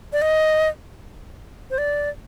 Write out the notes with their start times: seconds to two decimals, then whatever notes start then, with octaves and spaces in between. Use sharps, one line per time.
0.13 D5
0.22 D#5
1.71 C5
1.78 D5